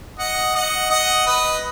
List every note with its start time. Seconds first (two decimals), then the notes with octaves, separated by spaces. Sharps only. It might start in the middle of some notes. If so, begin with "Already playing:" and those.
0.19 D#5 F#5
0.55 D#5 F#5
0.90 D#5 F#5
1.27 B4 D#5